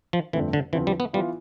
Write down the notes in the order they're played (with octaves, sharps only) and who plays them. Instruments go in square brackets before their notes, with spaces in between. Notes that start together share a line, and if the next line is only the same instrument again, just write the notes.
[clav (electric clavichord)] F3
[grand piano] G1 F2 D3 A3 C4 [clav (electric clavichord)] E3
[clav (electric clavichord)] D3
[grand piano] E2 D3 F3 C4 [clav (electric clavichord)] E3
[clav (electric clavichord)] G3
B3
[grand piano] E3 B3 F4 [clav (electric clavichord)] G3